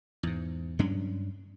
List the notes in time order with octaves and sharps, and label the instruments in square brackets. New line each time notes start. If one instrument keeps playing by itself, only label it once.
[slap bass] E2 G#2
G2 F#3 C#4 D4